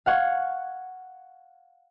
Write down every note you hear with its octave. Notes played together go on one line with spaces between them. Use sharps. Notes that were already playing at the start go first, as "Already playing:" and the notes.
F5 F#5 C#6 G#6